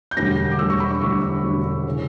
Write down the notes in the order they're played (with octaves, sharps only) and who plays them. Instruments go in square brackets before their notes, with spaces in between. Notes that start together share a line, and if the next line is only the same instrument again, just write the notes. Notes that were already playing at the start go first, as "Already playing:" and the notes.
[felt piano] G6
E1 D2 D3 G3 A#6
D6
E1 D2 D3 G3 E6
C#6
B5
C#6
E1 D2 D3 G3 C#6
E6
E1 D2 D3 G3
C#3 E3